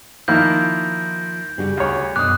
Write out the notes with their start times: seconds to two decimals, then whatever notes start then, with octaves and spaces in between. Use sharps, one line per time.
0.28 D#3 F3 A#3 E4 G6
1.58 C#3 G3 F#4
1.77 D2 C#5
2.16 F#2 B2 D6 D#6 F#6